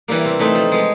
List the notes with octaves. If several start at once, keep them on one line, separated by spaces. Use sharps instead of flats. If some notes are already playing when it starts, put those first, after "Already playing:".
E3 G3 A#3
C3
E3 A3 C4 D#4
F3
G#3 B3